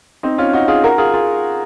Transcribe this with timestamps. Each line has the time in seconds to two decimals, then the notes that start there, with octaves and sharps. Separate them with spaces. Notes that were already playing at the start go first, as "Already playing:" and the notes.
0.23 C4 D#4
0.38 C#4 F4
0.53 D#4 F#4
0.68 F4 G#4
0.83 F#4 A#4
0.98 F4 G#4
1.14 F4 G#4